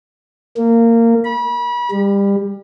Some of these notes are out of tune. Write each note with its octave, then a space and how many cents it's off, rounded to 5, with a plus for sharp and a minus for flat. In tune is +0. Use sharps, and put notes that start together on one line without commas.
A#3 -20
B5 -35
G3 +25